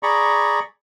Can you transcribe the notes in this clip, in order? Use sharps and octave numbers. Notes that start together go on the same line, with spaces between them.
G#4 D5 A#5 B5 C#6